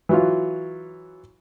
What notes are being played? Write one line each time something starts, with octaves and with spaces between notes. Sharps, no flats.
E3 F#3 F4